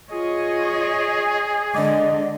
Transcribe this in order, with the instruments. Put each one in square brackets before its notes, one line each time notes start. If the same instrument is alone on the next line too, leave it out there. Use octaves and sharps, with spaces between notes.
[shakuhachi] F4 [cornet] G#4 [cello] C#5 D#5
[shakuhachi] G#5
[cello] D3 G#3 [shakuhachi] D#5